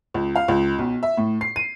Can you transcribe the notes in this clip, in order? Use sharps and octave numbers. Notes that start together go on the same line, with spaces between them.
C#2
F5
C#2
B1
E5
A2
C7
D#7